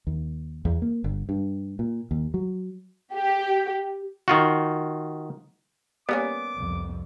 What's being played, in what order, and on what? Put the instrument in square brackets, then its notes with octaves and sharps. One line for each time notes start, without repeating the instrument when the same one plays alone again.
[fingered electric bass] D#2
E2
A#3
G1
G2
A#2
D#2
F#3
[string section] G4
[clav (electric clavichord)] D#3 F4 F#4
[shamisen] G3 A#3 C#4 [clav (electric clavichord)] B3 [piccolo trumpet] D6
[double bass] C2 F2